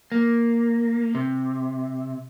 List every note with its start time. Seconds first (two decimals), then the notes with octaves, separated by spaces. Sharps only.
0.12 A#3
1.15 C3